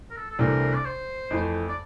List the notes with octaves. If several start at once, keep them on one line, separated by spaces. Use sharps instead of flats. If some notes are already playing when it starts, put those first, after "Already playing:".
A#4
A4
A4
C2 C3 E3 A3 D4 A#4
D5
C5
F2 E3 A3
D5